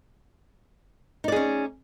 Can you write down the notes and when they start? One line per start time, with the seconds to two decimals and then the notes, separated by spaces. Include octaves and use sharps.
1.24 D#4
1.28 D5
1.32 G#4
1.36 C#4